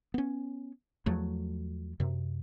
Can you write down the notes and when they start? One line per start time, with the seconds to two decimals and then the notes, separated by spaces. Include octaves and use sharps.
0.14 B3 C#4
1.06 E2 F3 F#3 A3
2.00 F#2 C3